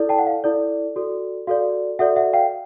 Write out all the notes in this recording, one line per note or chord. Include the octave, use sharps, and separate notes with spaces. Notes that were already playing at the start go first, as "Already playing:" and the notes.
Already playing: E4 A4 D5
G5 A5
F#5
F5
E4 A4 D5
F#4 A4 D5
F#4 A4 D5 F5
F#4 A4 D5 E5 F#5
E5 F#5
F5 G5